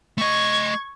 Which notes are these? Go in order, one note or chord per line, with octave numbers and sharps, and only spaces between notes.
A3 D#5 C#6 G#6